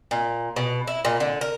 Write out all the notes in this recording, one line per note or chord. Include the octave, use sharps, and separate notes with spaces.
A#2
B2
E4
A#2
D3
A#4